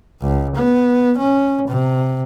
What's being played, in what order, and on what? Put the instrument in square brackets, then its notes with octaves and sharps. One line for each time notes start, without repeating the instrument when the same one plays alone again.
[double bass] C#2
B3
C#4
C3